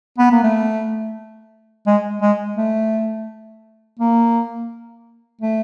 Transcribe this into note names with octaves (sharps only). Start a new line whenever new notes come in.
B3
A#3
A3
G#3
G#3
A3
A#3
A3